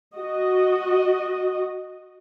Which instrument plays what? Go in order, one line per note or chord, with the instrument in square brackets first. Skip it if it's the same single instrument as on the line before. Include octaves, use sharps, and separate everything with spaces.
[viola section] F#4 D#5